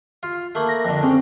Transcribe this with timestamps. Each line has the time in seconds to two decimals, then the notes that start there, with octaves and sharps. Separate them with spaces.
0.23 F4
0.55 A3 A#3 B5
0.68 A#6
0.85 F2 D3
1.03 C#3 C4